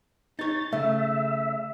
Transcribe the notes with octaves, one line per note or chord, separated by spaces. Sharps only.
D#4 C#5 A6
C#3 A3 E5